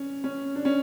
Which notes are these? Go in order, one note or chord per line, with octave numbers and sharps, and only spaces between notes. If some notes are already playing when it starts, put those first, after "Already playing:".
Already playing: C#4
C#4
D4
C#4